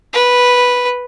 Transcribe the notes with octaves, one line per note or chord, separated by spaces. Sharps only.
B4